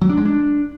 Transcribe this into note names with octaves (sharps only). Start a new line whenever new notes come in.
F#3
D4
G#3
D4